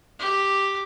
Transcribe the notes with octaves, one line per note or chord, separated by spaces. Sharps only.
G4